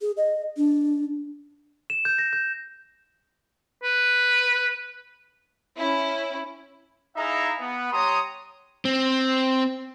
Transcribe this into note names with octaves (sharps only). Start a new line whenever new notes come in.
G#4
D#5
D4
E7
G6
A#6
G6
B4
C#4 E4
D#4 E4 G#4 E5 F5 A#5
B3
G3 C#5 A#5 C6 D#6
C4